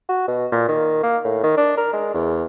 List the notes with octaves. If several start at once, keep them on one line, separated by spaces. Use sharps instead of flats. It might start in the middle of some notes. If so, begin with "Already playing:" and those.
F#4
B2
A#2
D#3
A#3
A2
D#3
D4
A#4
G#3
E2